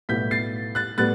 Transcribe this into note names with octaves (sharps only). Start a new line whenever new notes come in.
B1 A2 G3 B3 E4 G6 B6
A6 C7
F#6 A6
A2 G3 B3 F#6 A6